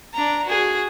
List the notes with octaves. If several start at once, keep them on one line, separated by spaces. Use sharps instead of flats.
D4 A#5
F#4 G#4